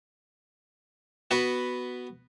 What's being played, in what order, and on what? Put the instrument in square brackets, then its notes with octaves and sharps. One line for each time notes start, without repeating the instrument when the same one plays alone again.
[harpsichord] B3 F#4 B4